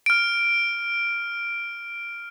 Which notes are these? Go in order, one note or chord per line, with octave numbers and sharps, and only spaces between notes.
F6 D7